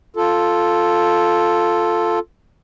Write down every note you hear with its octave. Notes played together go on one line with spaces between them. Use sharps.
F4 A4